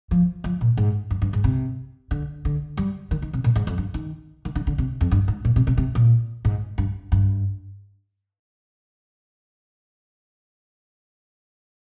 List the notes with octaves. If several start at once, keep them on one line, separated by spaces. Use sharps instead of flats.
F3
F3
A#2
G#2
G2
G2
G#2
C3
D3
D3
G3
D#3
D#3
C3
A#2
G#2
F2
G2
D#3
D#3
D3
D3
C3
F2
G2
G#2
A#2
C3
C3
C3
A#2
G#2
G2
G2